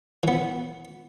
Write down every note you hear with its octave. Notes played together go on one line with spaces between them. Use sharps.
E3 B3